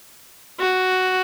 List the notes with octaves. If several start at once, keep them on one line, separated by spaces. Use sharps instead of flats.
F#4